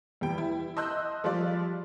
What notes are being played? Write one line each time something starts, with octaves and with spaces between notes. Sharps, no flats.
E2 G3 G5
E4
D#5 A5 C6 E6 F#6 G6
F3 G3 G#3 F4 D5 C6